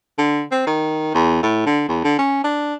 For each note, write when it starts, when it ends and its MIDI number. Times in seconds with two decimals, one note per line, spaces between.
0.18 0.43 50
0.52 0.63 60
0.67 1.14 51
1.15 1.40 40
1.43 1.65 45
1.66 1.84 50
1.89 2.04 40
2.04 2.18 50
2.19 2.42 61
2.44 2.75 62